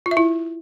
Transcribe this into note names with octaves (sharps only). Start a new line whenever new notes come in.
F4
E5
E4